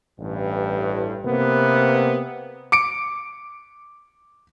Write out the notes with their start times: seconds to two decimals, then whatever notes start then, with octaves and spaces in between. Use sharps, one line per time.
0.19 A1 G2
1.25 C3 A#3 B3
2.72 D6 C#7 D7